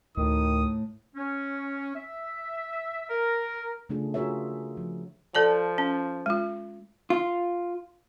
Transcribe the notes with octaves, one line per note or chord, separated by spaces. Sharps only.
D2 A2 D#3 D#6
C#4
E5
A#4
C#3 A3 D4 F4 G#4
F4 F#4 G#4 A#4 C#5 E5
F3
F3 A4 D5 A5
C#4
G#3 F4
F4